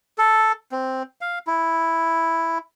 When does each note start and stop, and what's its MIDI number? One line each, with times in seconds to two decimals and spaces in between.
0.18 0.52 69
0.72 1.03 60
1.21 1.39 77
1.47 2.58 64